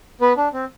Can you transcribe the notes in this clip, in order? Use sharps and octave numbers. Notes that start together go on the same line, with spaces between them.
B3 B4
D4
C4